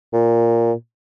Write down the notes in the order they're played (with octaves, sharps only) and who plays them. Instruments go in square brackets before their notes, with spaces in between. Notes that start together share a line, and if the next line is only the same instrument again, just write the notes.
[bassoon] A#2